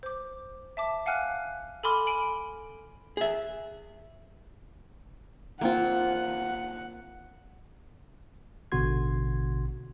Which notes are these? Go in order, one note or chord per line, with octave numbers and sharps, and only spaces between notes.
C5 D6
E5 A5 D6
F5 F#5 G#5 F6 F#6
A4 G#5 B5 C6 D6 F6
G#5 D7 F#7
G#4 E5
A#3 C4 F4 F#5
A1 B2 D3 F#4 C6 G#6